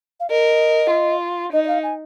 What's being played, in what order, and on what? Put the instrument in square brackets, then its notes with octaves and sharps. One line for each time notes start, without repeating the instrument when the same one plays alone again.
[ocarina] F5
[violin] A#4 [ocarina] D#5
[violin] F4
[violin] D#4 [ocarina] D#5
[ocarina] D#5
F5
G#5